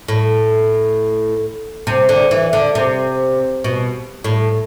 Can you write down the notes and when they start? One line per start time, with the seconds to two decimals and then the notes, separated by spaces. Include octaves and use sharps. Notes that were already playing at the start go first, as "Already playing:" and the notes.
0.08 A2
1.87 C3
2.09 D3
2.31 E3
2.53 D3
2.75 C3
3.64 B2
4.24 A2